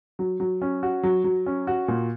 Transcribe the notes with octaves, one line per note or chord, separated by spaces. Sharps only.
F#3
F#3
C#4
F#4
F#3
F#3
C#4
F#4
A#2